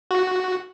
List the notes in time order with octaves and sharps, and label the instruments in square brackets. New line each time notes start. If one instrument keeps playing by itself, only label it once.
[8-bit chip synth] F#4